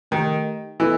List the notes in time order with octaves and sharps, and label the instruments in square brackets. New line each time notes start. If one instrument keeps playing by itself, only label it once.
[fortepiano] D#3 [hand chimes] A3 D#4 G4 D#5
[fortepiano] E3 [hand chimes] B3 D#4 A4 D#5